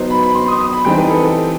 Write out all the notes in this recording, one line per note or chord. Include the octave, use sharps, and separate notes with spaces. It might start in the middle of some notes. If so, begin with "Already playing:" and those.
Already playing: F#3 B3 D#4 C5
B5
B5
C6
D#6
D#6
B5
E3 G3 C4 D#4 G5
B4
A4
A4